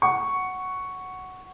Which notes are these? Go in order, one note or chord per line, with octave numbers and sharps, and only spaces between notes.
F#5 C#6